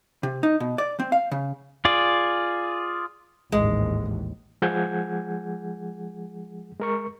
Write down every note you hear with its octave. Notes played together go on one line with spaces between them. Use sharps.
C3
D#4
B2
D5
C4
F5
C#3
F4 G#4 D5
A1 D#2 G#2 G#3
F3 G#3 G#4 F#5 G6 G#6
G#3 A#4 C#6